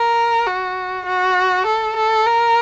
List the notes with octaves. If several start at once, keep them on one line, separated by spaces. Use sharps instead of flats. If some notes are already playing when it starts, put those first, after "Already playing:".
Already playing: A#4
F#4
F#4
A4
A4
A#4